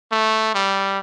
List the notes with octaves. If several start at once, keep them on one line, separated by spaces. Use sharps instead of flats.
A3
G3